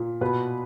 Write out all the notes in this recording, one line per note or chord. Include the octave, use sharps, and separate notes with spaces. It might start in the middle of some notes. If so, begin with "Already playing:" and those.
Already playing: A#2
B2 B4